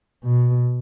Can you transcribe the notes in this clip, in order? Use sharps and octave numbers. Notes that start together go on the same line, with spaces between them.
B2